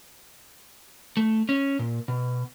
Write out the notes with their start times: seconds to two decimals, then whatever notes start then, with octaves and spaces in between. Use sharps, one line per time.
1.17 A3
1.49 C#4
1.79 A#2
2.08 B2